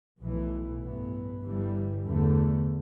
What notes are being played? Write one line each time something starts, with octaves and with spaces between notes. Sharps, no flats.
B1 A2 E3
A1 G2 E3 B3
G1 G2 E3 G3
E2 D3 A3